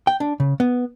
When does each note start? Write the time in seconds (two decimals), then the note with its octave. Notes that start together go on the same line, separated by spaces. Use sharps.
0.07 G5
0.20 D4
0.40 C#3
0.60 B3